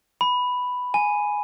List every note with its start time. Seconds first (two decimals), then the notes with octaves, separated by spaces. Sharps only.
0.21 B5
0.94 G#5